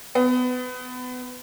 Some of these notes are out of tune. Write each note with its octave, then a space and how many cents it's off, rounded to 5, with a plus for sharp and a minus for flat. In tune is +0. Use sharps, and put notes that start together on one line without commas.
B3 +25